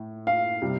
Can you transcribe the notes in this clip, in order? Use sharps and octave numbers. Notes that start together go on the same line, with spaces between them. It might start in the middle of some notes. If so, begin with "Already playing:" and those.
Already playing: A2
F5
C3 G3